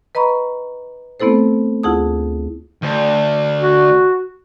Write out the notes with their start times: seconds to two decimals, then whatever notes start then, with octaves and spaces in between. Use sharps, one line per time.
0.15 B4 D#5 A#5 B5 C#6
1.20 A3 B3 C4 E4 A4 C5
1.83 D2 E4 F4 G#4 A5 D#6
2.83 D2
3.61 F#4